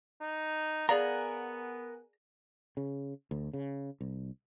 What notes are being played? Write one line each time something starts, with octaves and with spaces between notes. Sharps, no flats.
D#4
B3 G#4 A#4 D5 F5 F#5 G#5 A#5
C#3
D2
C#3
C2